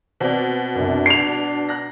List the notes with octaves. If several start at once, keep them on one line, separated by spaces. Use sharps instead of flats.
B2 C4 D5
C2 F#2 D4
C7 D7 F7
A#5 F#6 A#6